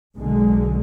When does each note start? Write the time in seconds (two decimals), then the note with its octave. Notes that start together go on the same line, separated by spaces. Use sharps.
0.16 B1 B2 D3 G#3